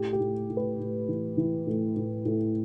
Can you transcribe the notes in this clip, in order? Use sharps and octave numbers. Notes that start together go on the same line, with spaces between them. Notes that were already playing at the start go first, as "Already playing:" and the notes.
Already playing: A2 G4
G4
A2
A2
B4
A2
E3
E3
A2
A2
A2